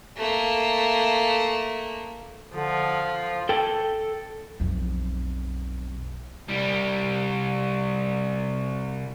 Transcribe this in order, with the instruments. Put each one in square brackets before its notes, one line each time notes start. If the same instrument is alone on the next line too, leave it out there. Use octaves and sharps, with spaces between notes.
[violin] A3 A#3
[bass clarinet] D3 [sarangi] F3
[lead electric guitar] A4 G5
[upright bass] B1 F2
[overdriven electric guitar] C2 G3